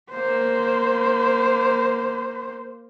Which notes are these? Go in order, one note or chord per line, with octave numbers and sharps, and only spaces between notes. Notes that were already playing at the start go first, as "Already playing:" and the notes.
A#3 C5